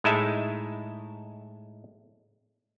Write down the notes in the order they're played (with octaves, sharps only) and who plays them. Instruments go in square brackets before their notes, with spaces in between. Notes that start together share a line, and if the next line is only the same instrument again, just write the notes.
[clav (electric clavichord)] A2 G#3 D#4 E4 E5 A5